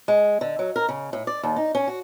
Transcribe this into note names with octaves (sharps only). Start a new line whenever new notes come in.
G#3
D3
F#3
A#4
C#3
A2
D5
D#2
D#4
C#4
F#4